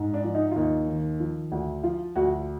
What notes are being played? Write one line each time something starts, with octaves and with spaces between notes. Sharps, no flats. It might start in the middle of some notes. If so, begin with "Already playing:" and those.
Already playing: G#2
D4
F3
D#4
F4
D#2 D#4
D#3
F3
D2
F3 F4
D2 F#4